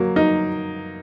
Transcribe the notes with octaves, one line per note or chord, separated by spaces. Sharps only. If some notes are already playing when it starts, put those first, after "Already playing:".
Already playing: F#3 A#3
D#4